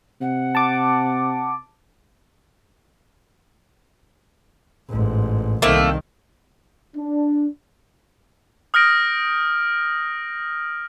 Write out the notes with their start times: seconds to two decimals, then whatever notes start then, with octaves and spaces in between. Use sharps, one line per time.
0.21 C3 F#5
0.55 A5 D6
4.89 A1 G#2
5.62 C2 D#3 A3 A#3 C4
6.97 D4
8.74 D#6 F6 G6 A#6 D7